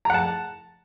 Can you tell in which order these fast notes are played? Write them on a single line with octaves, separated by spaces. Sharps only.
A#5 F#5 A5